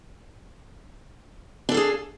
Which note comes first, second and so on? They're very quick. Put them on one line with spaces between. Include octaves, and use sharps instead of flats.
D4 A4 F5 G#4